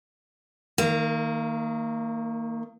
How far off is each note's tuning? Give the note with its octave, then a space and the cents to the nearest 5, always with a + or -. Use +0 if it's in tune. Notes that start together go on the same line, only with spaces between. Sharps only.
D#3 +15 A#3 -25